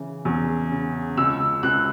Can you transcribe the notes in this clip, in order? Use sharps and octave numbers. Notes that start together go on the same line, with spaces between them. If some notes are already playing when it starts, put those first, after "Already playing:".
Already playing: C#3 E3
E2
C#3
C#2 E6
C#2 F#6